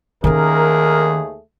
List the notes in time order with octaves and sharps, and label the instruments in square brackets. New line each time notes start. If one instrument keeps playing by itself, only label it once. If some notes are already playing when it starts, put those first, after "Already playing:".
[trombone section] D#2 A3 G#4 [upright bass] D#3 C#4 [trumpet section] A#4